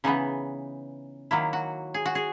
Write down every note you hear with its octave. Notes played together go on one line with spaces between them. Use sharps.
C#3 E3 B3 D#4
D#3 F#3 A#3 E4
F#4
G#4
F#4
G#4